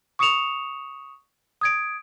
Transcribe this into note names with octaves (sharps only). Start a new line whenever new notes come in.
C#6 D#6 C#7 E7 F7
D#6 G#6 D7